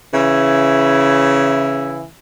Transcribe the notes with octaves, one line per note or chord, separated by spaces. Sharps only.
C#3 E3 E4